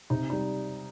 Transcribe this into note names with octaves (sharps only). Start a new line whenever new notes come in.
C3 D#4
G3 D#4